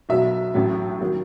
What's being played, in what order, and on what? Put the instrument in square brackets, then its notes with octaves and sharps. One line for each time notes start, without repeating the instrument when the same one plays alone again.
[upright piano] B1 B2 F#3 E5
A1 A2 F#3
D#3 F#3